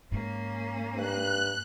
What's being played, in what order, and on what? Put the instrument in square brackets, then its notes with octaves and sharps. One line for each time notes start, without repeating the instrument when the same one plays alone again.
[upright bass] G#2 [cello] A#3 C#4
[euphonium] G2 [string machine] F#6